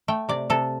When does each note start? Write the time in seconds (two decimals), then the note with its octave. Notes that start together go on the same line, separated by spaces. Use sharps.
0.08 A3 G5
0.29 C3 D5
0.50 C3 A4